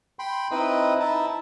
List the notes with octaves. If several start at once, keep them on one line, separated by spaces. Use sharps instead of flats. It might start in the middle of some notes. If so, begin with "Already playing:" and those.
G5 B5 C6
C4 D#4 E4 B4 D#5
D#4 E4 E5 A5